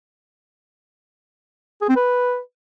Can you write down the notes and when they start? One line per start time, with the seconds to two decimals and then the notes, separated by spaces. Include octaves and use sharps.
1.82 G#4
1.89 C4
1.96 B4